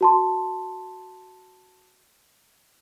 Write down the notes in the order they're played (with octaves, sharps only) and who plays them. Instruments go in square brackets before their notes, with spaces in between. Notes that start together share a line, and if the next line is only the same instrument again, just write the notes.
[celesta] F#4 A5 C6